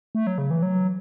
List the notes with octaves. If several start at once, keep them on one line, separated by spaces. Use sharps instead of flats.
A3
F#3
C#3
E3
F#3